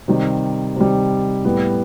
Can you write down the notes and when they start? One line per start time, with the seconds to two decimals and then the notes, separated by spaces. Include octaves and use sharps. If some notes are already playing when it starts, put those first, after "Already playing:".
0.08 C3 D#3 G3
0.76 C3 D#3 G3
1.45 A2 G3 B3